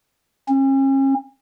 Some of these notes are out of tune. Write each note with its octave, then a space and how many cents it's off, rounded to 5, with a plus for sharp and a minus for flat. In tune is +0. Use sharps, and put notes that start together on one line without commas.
C#4 -40